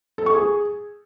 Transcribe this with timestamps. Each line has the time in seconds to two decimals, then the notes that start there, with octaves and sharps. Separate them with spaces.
0.18 A4
0.26 C#6
0.35 G#4